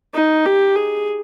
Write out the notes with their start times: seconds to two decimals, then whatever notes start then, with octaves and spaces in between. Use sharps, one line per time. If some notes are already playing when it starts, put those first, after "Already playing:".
0.14 D#4
0.46 G4
0.76 G#4